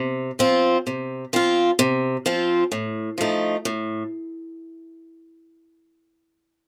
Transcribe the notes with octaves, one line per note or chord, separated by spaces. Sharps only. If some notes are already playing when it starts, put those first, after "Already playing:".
Already playing: C3
F3 C4 F4
C3
F3 C4 F4
C3
F3 C4 F4
A2
F3 A3 D#4
A2